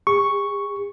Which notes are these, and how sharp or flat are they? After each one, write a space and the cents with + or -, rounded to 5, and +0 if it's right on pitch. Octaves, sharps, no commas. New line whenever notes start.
G#4 -40 C#6 +0